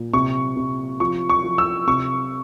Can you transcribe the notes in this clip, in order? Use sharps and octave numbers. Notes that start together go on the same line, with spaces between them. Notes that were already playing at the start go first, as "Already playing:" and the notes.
Already playing: A#2
C3 C#6
C3
F3 C#6
C#6
F3
E6
C3 C#6